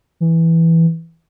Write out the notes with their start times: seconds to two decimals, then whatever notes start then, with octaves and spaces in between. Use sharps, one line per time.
0.20 E3